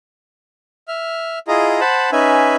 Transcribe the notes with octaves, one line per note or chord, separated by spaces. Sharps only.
E5 F6
E4 F4 G#4 D#5 A#5
C5 F#5 A5 B5
C#4 D#4 B4 E5 G#5